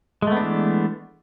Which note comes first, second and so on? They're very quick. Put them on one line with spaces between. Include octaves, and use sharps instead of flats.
G#3 A3 B3 D4 E3